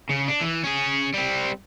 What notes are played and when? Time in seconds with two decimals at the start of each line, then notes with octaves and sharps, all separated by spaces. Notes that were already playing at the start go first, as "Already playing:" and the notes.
0.09 C#3
0.28 D4
0.41 E3
0.64 C#4 G#4
1.14 G3 C4